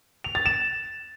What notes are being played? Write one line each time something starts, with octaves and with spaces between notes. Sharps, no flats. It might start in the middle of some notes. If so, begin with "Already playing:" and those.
F7
A6
E7